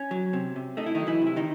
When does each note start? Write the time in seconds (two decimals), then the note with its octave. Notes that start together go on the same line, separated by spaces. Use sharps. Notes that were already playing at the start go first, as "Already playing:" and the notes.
Already playing: C#4
0.11 F#3
0.33 C3
0.56 C3
0.77 A3 D#4
0.86 E4
0.95 D#3 F#3 D#4
1.07 E3 E4
1.22 C3
1.27 E4
1.36 D#3 D#4